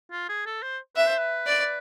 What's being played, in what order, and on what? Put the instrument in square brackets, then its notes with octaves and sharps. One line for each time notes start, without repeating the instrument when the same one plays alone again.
[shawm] F4
G#4
A4
C5
[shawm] B4 [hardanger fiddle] E5
[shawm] C5
B4
[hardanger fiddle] D5